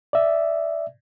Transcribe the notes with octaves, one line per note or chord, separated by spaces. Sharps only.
D5 E5